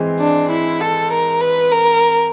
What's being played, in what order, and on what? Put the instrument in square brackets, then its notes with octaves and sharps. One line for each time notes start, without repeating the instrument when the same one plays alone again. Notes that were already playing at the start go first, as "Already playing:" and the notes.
Already playing: [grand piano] E3 G#3 C4
[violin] D4
E4
A4
A#4
B4
A#4